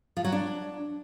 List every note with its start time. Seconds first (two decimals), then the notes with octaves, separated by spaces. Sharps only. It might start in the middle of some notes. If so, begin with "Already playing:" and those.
0.17 F3
0.24 F#3
0.32 D4